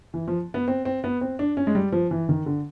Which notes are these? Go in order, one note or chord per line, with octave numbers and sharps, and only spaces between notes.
E3
F3
B3
C4
C4
B3
C4
D4
C#4
G#3
G3
F3
E3
D#3
D3